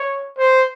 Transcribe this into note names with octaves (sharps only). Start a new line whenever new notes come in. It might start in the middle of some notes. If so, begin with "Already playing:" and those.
Already playing: C#5
C5